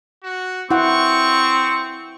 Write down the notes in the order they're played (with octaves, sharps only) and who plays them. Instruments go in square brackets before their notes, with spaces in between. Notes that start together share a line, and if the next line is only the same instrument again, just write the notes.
[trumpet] F#4
[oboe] C4 [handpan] E4 F#5 [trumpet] C#6